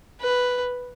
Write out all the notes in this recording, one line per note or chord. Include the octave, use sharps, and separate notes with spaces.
B4